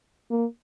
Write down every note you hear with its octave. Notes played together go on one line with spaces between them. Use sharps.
A#3